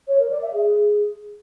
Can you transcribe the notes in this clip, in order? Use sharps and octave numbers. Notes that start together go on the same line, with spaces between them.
C#5
A#4
D5
E5
G#4